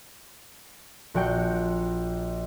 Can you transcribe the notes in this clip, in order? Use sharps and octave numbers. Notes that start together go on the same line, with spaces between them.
A#1 F#4 G5 C#7